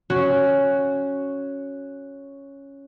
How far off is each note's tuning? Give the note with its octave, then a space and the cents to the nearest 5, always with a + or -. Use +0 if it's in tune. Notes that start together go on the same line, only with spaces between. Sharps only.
C#4 +0 F#4 +0